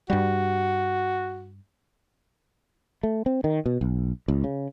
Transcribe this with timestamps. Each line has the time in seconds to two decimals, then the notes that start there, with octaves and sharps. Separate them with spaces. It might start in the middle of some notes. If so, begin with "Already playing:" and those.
0.10 G2 G3 F#4
3.03 A3
3.26 C4
3.44 D#3
3.66 B2
3.81 B1
4.28 C#2
4.44 C#3